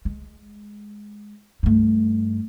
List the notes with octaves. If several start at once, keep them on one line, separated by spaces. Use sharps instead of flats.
G#3
G2 A3